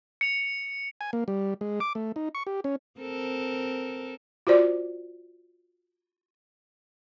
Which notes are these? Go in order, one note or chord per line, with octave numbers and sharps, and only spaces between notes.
C#7 F7
G#5
A#3
G3
G#3
D6
A3
D#4
C#6
G4
C#4
C4 A4 A#4
F4 F#4 C5 D5